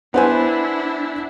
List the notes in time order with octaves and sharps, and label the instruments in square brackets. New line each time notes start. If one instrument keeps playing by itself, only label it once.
[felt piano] B3 C5 G#5 [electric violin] D4 E4